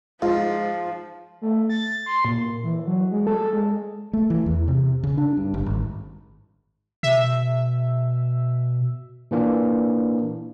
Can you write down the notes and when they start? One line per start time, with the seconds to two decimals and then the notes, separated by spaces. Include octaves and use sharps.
0.22 G#2 F3 F4 F5
1.42 A3
1.70 A6
2.06 C6
2.25 A#2
2.64 E3
2.87 F#3
3.12 G#3
3.27 A4
3.53 G#3
4.13 A3
4.30 E3
4.46 E2
4.68 C3
5.04 C#3
5.17 D4
5.37 G2
5.54 G1
5.66 G#1
7.03 B2 E5
9.31 A#2 E3 A#3 D4